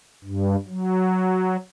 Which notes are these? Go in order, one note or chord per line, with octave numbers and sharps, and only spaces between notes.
G2
F#3